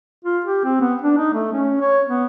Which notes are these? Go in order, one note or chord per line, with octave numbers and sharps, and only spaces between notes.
F4
G4
C4
B3
D4
D#4
A3
C#4
C#5
B3